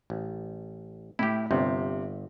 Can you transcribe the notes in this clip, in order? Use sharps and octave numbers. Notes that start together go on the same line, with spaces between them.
A1
A2 E4 G4
G1 C3